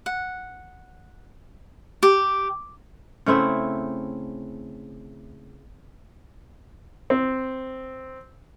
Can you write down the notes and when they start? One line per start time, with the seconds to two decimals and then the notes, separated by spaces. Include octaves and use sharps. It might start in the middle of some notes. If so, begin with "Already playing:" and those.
0.06 F#5
2.03 G4
3.26 C#3 A3 C4 E4
7.10 C4